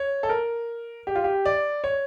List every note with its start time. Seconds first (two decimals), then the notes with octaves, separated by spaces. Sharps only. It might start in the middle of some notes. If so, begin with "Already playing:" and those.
Already playing: C#5
0.23 A4
0.29 A#4
1.07 G4
1.15 F4
1.24 G4
1.45 D5
1.84 C#5